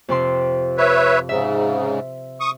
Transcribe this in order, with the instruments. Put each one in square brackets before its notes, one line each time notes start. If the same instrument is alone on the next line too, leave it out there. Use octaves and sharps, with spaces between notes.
[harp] F2 C3 C6
[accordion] B4 C#5 E5
[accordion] G#2 C#3 [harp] E5
[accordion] C#6 D#6